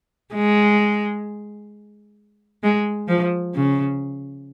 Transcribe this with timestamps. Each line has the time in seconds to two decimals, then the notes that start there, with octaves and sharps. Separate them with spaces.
0.34 G#3
2.63 G#3
3.08 F3
3.55 C#3